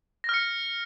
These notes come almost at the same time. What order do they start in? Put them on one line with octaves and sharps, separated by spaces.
A#6 F6 C#7